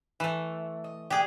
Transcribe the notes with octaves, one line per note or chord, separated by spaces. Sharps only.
E3 A3
D#5
D3 G4 G#4 G5